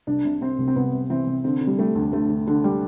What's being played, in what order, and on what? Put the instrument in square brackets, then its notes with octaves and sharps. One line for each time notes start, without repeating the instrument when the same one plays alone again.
[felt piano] C2 [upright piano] D4
[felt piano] C3
[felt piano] C3 [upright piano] C4
[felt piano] C2
[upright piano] C4
[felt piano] C2 [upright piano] B3
[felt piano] C3
[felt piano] E3 [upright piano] C4
[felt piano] C3
[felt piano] D3 [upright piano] C4
[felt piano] D3
[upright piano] G3
[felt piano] G3 [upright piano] A3
[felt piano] D2
[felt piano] D2 [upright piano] A3
[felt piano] D3
D3
G3